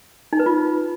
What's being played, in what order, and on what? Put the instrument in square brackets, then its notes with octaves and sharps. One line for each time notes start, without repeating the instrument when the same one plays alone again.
[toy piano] D#4
B4
F4